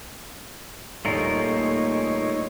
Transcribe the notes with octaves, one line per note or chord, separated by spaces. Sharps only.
D#1 A#1 A3 D#4 F4 A#4 C#5 C#7